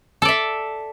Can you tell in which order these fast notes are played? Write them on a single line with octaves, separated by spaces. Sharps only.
A4 D5 E5